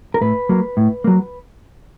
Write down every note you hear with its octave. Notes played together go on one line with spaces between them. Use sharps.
A#4
A2 B4
F#3 A#3
A2
F#3 A#3